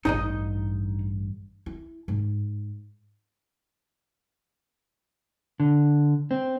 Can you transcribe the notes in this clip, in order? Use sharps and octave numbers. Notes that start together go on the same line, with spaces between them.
A1 G2 D#4 D#5
E4
G#2
D3
C4